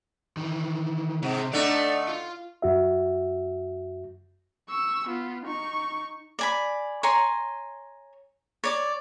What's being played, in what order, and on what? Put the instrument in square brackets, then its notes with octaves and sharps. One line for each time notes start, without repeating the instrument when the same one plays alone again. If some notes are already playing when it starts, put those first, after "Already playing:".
[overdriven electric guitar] D#3 E3
[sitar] G#2 [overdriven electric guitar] C3
[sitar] D3 A3 D#4 [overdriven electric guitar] D5
[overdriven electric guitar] F4
[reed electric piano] F#2 F#4 E5
[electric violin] C#6 E6
B3 F4
D#4 C#6
[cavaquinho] D5 G#5 B5
C#5 G#5 A#5 C6
C#5 D5 D6